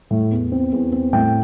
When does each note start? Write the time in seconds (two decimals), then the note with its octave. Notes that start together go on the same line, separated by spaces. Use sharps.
0.11 A2
0.32 E2
0.52 C4
0.72 E2
0.92 C4
1.13 A2 G5